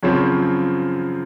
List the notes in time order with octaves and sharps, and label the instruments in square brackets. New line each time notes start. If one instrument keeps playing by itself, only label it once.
[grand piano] F#2 C#3 F3 C4 C#5